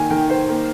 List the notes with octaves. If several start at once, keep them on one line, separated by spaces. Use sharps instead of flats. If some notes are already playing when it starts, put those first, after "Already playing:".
Already playing: D#3 A#3 G#5
D#3 G5
C5
A#3